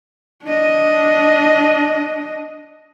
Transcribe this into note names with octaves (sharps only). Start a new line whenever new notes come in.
D4 D#5